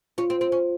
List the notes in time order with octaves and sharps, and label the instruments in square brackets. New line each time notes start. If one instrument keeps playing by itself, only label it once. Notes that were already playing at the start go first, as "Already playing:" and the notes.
[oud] C#4 [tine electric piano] F4
[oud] C4
C4
C#4